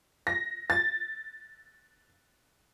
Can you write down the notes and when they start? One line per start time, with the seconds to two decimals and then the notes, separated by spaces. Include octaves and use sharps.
0.27 A#6
0.70 A6